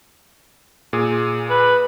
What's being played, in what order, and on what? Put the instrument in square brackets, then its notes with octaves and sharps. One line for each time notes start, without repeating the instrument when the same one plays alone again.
[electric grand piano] A#2 G#4
[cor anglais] B4